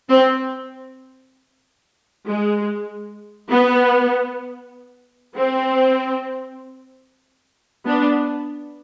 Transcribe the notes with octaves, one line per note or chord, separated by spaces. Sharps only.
C4
G#3
B3
C4
B3 D4